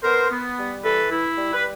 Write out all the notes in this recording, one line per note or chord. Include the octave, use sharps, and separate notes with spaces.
B3 A#4 C5
B3
G3
E3 A4 B4
E4
G3
B4